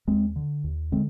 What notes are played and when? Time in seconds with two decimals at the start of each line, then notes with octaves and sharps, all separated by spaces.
0.08 D#2 G#3 C4
0.36 D3
0.64 D#2
0.92 D3 G#3 C4